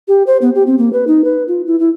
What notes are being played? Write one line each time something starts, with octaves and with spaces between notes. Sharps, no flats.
G4
C5
B3
G4
C4
A#3
B4
D#4
B4
F4
E4
E4